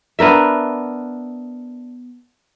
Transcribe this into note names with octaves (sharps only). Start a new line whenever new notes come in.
B3 D4 A#4 E5